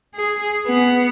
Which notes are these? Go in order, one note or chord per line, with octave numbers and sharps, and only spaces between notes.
G#4
B3